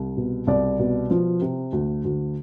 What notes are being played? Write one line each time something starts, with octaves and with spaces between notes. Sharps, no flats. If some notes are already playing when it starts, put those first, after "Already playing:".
Already playing: C2
B2
C2 D5
B2
F3
C3
D2
D2